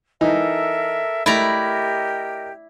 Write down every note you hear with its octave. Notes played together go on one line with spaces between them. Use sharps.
E3 D#4 A4 A#4 E5
A3 E4 G4 A#4 D5 D#5 A#5